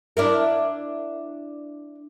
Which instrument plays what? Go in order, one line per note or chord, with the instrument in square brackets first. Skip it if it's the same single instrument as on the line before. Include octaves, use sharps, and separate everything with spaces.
[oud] D4 E4 A#4